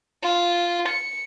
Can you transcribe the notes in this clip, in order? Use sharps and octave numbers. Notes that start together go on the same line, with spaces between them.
F4
C#7